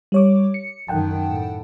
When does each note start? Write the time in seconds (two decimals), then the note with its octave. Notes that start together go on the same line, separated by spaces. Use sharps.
0.12 G3 C#5 D6
0.54 C#7
0.88 F#2 D#3 F#5 G5 A5
1.29 A2